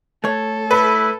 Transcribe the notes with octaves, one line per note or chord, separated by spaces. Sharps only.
A3 A4 C#5
E4 B4